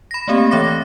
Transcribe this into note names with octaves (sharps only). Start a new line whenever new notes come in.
B5 A#6
A3 A#3 C4 G4
E3 C#5 E5 D6 A#6